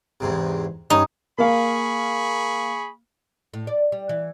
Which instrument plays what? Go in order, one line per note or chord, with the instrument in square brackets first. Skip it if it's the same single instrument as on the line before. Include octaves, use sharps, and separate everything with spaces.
[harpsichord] E2 G#2 C3
[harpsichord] G2 C#4 [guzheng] D#4
[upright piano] A#3 F5 [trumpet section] G#4 B5 C#6
[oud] A2
D5
G3
E3